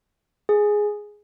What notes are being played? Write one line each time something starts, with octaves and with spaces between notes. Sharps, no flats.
G#4